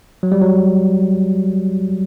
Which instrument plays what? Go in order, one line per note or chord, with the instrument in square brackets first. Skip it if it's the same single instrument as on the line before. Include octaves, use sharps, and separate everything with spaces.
[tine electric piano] F#3
G3
F#3